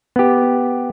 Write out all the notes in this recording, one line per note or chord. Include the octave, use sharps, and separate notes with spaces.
B3 G4